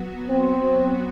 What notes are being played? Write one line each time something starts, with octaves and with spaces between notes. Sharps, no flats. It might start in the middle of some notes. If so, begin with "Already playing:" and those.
Already playing: F#3 B3 F#4
C4